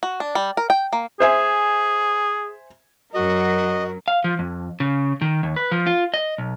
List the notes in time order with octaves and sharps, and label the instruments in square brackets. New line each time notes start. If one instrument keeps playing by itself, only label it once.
[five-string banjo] F#4
D4
G3
A#4
G5
A#3
[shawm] G#4 [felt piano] C5 E5 G#5
[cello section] F#2 F#3 [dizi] F#4 [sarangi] A#4 [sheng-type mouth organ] D#5
[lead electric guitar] F5
F3
F2
C#3
D#3
D#2
B4
F3
F4
D#5
B1